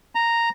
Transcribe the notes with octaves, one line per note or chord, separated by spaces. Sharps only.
A#5